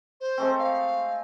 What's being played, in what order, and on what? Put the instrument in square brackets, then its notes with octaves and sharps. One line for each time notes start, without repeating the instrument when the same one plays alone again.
[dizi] C5
[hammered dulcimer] G#3 A3 C4
[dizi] F5